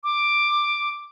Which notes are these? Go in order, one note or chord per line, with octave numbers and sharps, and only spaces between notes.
D6